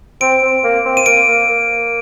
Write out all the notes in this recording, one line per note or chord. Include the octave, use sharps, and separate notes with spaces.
C4 D7
C4
A#3
C4
D#7
A#3 D7
A#3
A#3